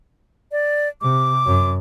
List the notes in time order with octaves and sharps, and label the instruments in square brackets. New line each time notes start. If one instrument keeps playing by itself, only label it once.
[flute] D5
[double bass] C3 [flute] D6
[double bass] F#2